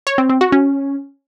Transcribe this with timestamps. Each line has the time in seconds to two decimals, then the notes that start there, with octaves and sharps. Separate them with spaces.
0.07 C#5
0.18 C4
0.29 C4
0.41 F#4
0.52 C#4